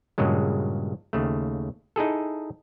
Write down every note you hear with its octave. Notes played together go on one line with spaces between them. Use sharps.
G2 A#2 C#3 F#3 G#3
D#2 C#3 A3
D#4 E4 G#4 A4